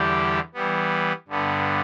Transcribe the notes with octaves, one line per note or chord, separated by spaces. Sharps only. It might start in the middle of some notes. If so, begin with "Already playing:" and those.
Already playing: E2 D3 G3 E4 G4
E3 G3 B3
G2 D3 B3